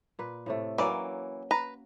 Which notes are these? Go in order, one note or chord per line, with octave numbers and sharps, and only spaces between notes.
A#2 B4
A2 C3 A3
E3 F#3 A#3 C#4 D5
B4 A#5